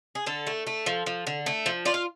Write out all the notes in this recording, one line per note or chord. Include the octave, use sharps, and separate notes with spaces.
G#4
D3 A4
A3
A3
F3
F3
D3
A3
F3
F4 D5
F5